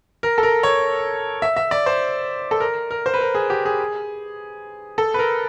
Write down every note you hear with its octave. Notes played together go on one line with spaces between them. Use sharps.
A#4
A4
A#4
C#5
E5
E5
D5
C5
A4
A#4
A#4
C5
B4
A#4
G#4
G4
G#4
A4
B4
A#4